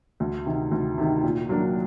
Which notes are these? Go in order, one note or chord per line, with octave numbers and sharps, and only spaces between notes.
D2
C3 D#3
D2
C3 D#3
A#2
F#3 A#3 D4